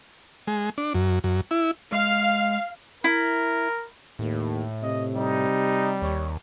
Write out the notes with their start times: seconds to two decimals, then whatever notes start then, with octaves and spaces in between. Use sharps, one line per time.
0.47 G#3
0.78 D4
0.94 F#2
1.24 F#2
1.51 E4
1.92 G#3 F5
3.04 E4 A#4
4.19 D#2 A2
4.83 C3 D#5
5.15 G3 D#4
6.02 D#2 C#5